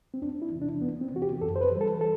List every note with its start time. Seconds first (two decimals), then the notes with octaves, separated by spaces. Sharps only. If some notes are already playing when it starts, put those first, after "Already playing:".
0.14 C4
0.22 E2 D4
0.42 E4
0.52 C3 E3
0.62 D4
0.82 E2 B3
1.01 C4
1.11 C3 E3 F#4
1.22 G4
1.41 F#2 A4
1.56 C5
1.61 B4
1.72 E3 G3
1.81 A4
2.01 A4